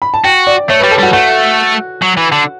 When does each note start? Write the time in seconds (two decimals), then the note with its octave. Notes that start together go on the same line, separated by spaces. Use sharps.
0.02 B5
0.14 A5
0.24 F#4 G5
0.47 D5
0.69 A3 C#5
0.79 B4
0.83 G3
0.91 A4
0.99 G3 F#4
1.13 A3 F#4
2.02 F#3
2.17 E3
2.32 D3